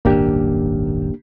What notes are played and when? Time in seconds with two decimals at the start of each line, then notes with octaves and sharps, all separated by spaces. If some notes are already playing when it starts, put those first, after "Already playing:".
0.05 D#1 G#1 F#2 A#3 D4 G4